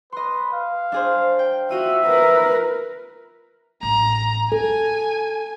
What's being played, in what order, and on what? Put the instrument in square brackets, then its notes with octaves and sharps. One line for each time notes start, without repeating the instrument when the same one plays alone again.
[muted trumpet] B4 [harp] D#5 C6
[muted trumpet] F5
[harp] D4 G#4 C5
G5
[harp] F4 D#7 [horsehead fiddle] F#4 [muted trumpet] E5
[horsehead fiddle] A#4 B4
[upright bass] A1 [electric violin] A#5
[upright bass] F4 [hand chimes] A4 [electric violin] G#5